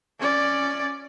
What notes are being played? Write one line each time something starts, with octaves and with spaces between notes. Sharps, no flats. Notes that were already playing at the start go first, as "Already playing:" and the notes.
C#4 D5